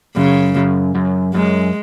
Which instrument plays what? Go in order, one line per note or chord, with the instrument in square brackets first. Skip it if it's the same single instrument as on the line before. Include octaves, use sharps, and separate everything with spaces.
[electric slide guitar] F#2 [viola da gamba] C#3
[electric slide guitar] F#2
F#2
[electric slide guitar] F#2 [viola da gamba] G#3